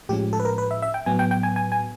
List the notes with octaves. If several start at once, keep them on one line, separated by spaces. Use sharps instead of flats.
A2 F3 G#3 C#4 G4
A4
B4
A#4
B4
E5
E5
G5
A2 F#3 B3 G#5
G5
G5
G#5
G#5
G#5